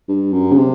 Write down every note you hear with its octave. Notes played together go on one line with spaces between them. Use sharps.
G2
F#2
C#3
C3